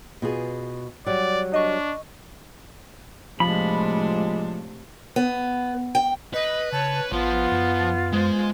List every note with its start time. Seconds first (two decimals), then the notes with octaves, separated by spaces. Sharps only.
0.22 B2 F4 G#4
1.06 F#3 G3 D5
1.54 D4 D#5 C#6
3.40 A2 C3 F3 G#3 D4 B5
5.16 B3
5.95 G5
6.34 B4 D#5
6.72 C#3 C#5 A5
7.12 A1 F3 B3 F4 A5
7.51 F#2
8.13 G#3 C5